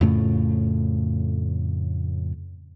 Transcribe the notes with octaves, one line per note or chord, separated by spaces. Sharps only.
F2 A2 C#3 A3